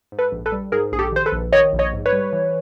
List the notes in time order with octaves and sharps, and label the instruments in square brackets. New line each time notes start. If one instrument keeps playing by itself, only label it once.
[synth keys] G#2
A4 B4
A#1
A4 B4
G3
G#2 G#4 A#4
A#1 G#4
G4 A4
D#3 C5
A4 B4
A#1
D#3 C#5 D#5
A#1
C#5 D#5
G#2
B4 C#5
G3
E3